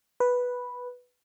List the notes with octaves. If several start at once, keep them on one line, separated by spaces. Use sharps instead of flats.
B4